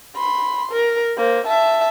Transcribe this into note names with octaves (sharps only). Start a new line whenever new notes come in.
B5 C6
A#4
A#3 C5
E5 A5